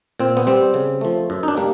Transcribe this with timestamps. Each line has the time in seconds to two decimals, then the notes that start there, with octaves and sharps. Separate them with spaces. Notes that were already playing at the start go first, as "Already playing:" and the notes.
0.20 A#2 C4
0.37 B3
0.47 G3 B3 C4
0.74 C#3
1.01 F3 A3
1.30 F#2
1.43 D#4
1.48 D4
1.57 G3 A#3